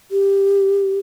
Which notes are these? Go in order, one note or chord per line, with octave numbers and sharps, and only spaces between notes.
G4